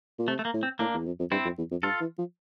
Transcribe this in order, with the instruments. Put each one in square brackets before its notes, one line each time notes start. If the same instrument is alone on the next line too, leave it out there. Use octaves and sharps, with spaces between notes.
[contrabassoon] A#2
[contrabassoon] C3 [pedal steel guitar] A3
[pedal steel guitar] A3
A#3
[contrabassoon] A2
[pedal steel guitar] C4
[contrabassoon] A2 [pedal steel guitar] A#3 D4
[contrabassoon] E2
F2
F2
[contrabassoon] G2 [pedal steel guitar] C4 E4
[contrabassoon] F2
E2
F2
[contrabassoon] G2 [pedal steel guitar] F4 A4
[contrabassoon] E3
F3